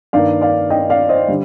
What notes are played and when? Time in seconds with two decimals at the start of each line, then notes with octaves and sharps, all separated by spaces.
0.13 G2 D#3 A#3 D5 F5
0.41 D5 F5
0.70 D#5 G5
0.90 D5 F5
1.09 C5 D#5
1.28 D3 G3